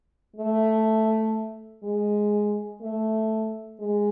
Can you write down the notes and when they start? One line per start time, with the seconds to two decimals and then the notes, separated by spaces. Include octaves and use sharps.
0.36 A3
1.83 G#3
2.81 A3
3.79 G#3